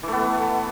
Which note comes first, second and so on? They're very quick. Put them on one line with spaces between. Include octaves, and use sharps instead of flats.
E3 A3 B3